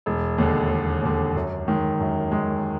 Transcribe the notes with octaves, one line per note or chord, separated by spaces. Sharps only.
E1
D#2 D3
E1
D#2 D3
F#2
D#3 G#3
F#2
D#3 G#3